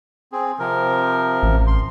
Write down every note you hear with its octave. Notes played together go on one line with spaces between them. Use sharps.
C4 G#4
C3 F3 A#4
A1
C6